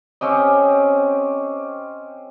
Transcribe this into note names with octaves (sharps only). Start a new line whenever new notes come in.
C4 C#4 G4 D#5